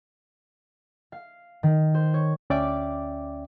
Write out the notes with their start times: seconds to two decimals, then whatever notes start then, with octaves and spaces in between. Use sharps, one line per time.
1.12 F5
1.63 D#3
1.94 C5
2.14 C#5
2.50 D2 C#4 D5 E5 G5 D6